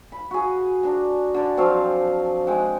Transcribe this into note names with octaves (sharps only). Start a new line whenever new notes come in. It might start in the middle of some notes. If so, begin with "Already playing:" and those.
B5
F#4 G#4
D4 A#5
D3 D5
F3 F#3 C4 F5
G#3 F#5 G5